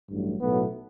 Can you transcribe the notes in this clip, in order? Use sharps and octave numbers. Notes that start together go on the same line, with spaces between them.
A1 G2 F#3 A3
B1 A2 F#3 A3 B3